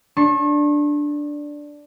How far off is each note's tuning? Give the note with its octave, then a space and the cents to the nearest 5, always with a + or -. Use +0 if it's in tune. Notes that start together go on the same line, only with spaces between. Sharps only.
D4 +0 C#6 -40